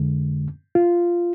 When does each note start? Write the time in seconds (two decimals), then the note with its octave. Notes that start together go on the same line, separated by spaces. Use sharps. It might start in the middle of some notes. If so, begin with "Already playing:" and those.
Already playing: F2 D3 G#3
0.75 F4